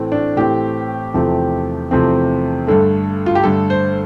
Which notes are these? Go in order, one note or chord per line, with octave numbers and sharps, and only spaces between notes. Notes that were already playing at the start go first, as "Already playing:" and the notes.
Already playing: A2 E3 A3 C4
D4
A2 E3 A3 C4 G4
E2 C3 F3 A3 C4
E2 C3 F3 A3 C4
G2 D3 A3
F4
G4
G2 D3 A3 A4
C5